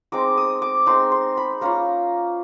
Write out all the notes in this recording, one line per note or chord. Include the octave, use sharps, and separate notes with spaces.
G#3 C4 D#4 D6
D#6
D6
G#3 C4 D#4 C6
C6
B5
A#3 C#4 F4 A#5